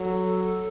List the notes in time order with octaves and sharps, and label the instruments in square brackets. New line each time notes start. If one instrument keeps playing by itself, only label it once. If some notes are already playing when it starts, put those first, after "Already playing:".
Already playing: [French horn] F#3 [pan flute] A4